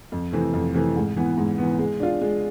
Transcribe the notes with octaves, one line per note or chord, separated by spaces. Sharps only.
F2
C3 E3 A3 C4
F2
C3 E3 A3 C4
G#2
E3 B3
G#2
E3 B3
G#3
D4 F4
G#3